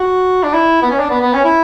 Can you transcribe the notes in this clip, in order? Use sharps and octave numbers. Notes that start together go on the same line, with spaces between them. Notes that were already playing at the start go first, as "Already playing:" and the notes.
Already playing: F#4
D4
E4
B3
C#4
D4
B3
B3
C#4
E4